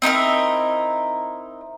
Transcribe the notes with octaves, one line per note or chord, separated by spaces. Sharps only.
C4 D#4 E4 A#4